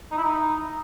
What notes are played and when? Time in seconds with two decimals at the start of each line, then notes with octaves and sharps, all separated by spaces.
0.11 D#4
0.17 E4
0.24 D#4